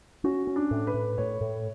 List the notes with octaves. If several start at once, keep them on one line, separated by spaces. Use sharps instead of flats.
C#4 F#4
C#4
D4
A2
B4
A2
A2 C#5
A2